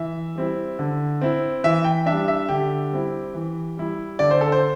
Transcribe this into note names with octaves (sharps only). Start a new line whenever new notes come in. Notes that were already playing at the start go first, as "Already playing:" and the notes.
Already playing: E3 E5
G3 C4 E4
D3
C4 E4
E3 E5
G5
G3 D4 E5
E5
D3 G4
G3 C4 E4
E3
G3 E4
D3 D5
C5
A4
C5